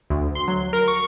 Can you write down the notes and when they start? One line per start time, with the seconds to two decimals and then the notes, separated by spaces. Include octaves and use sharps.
0.10 D2
0.35 C6
0.48 F#3
0.73 A#4
0.88 C#6